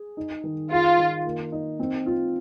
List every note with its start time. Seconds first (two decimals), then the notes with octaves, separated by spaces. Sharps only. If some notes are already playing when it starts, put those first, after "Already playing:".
Already playing: G#4
0.17 D#4
0.44 D#3
0.71 F4 G#4
0.98 D#3
1.25 A#3
1.52 D#4
1.80 C4
2.06 F4